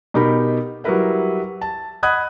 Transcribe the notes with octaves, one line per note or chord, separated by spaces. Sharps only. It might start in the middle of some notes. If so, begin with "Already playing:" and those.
B2 D#4 G4 A#4 B5
F#3 G3 E4 A#4 B4 E5
A5
D#5 F#5 B5 D#6 F#6 G#6